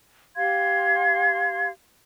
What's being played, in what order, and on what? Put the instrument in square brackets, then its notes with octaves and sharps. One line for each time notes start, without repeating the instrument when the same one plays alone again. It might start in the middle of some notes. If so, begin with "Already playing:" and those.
[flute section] G4 F5 C6 G#6